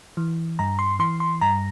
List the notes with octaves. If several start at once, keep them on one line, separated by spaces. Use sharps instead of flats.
E3
G2 A#5
C6
E3 C6
C6
G2 A#5